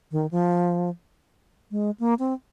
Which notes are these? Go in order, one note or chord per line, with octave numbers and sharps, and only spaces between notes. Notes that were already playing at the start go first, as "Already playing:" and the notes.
D#3
F3
G#3
A#3
C4